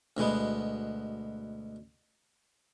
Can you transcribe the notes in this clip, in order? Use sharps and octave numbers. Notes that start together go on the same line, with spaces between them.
D2 B2 G#3 B3